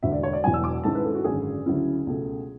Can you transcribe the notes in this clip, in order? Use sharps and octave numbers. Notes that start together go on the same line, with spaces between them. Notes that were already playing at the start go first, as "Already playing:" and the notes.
E1 D2 D3 E5
D5
C#5
D5
E1 E2 B2 F#3 G#5
E6
D6
G#1 G#2 G#3 C#4 E4 A5
B4
A4
F#4
G#1 F#2 D3 G#4
D2 C#3 F#3 C#4 E4
C#2 B2 A3